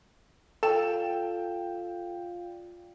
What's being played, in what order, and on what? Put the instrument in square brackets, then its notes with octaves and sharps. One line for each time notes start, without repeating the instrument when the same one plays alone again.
[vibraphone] F4 D5 F5 [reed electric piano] A4 [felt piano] G5 E7